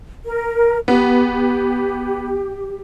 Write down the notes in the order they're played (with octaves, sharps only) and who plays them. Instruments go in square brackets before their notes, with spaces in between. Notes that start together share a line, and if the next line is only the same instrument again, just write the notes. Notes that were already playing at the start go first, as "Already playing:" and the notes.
[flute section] A#4
[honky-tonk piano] B3 [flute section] G4